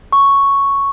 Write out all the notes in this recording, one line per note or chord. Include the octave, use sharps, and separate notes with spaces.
C#6